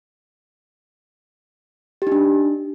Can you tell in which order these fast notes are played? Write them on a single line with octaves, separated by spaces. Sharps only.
G4 D#4 D4